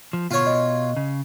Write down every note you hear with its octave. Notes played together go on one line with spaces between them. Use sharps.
F3
B2 F4 C#5
D#5
C#3